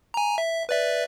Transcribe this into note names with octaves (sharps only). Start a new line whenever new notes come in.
G#5 A#5
E5
B4 D5 E5